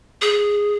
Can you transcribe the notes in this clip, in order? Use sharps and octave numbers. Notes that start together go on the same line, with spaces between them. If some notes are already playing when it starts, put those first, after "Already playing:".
G#4